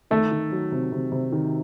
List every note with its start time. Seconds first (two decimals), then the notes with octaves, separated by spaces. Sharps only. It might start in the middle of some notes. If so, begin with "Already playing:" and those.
0.11 D#3 A3
0.31 D#3
0.52 F#3
0.72 C3
0.92 C3
1.12 C3
1.32 D#3